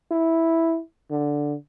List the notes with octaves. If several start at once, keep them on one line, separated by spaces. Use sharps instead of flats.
E4
D3